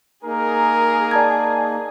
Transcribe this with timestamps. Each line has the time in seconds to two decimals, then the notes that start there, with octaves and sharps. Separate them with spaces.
0.25 A#3 D#4 G#4 A#4
1.11 D5 A5 G#6